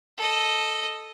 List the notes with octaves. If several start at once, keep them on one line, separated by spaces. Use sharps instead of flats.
A4 D#5